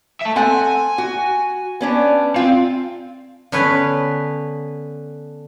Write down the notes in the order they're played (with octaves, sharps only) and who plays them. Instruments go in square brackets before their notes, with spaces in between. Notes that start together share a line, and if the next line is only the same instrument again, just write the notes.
[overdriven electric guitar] E5 A5
[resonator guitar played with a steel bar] C4 A4 F#5 [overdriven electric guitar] G#5
[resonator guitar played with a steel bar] F#4
B3 C#4 D4
[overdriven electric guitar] C4 [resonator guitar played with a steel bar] F4
[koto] D3 B3 C#4 B4